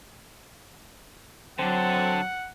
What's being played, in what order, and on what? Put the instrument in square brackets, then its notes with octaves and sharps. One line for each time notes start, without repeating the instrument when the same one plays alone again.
[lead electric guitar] D3 A4 [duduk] F#3 [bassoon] C4 [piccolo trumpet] F#5